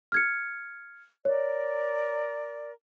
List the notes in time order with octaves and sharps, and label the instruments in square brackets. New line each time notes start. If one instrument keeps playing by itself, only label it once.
[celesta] F6 G#6 C#7
[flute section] A#4 D5 [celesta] C#5